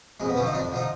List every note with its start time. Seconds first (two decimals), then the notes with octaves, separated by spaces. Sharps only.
0.20 F2 G#3
0.29 B3
0.36 D3 F3 C#4
0.46 D#4
0.53 F2 D4
0.71 D3 F3 D#4